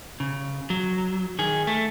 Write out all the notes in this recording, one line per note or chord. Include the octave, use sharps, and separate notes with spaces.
C#3
F#3
D#3 G#4
A3